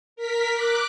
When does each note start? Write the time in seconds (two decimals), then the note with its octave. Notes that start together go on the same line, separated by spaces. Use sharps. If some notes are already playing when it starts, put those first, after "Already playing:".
0.16 A#4 B6
0.53 D6 F#6